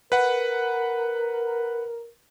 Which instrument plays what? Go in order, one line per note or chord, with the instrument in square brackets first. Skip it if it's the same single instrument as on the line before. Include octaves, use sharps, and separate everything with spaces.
[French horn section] A#4 [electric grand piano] B4 F#5